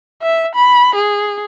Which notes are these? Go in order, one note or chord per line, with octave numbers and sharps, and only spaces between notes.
E5
B5
G#4